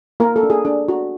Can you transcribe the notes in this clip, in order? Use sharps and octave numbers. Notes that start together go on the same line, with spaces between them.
A#3 A#4
A4
D4
G#4
D4
F#4